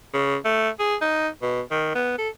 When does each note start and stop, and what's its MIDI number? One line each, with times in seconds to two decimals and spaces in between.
0.14 0.36 49
0.44 0.69 57
0.79 0.95 68
1.01 1.28 63
1.42 1.61 47
1.71 1.93 51
1.95 2.14 59
2.18 2.29 69